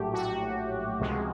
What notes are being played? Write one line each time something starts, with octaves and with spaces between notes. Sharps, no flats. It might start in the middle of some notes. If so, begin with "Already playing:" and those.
Already playing: A#1 A2 F#3 A3 G4
A#1 A2 F#3 A3 F#4
C#2 C3 F3 G#3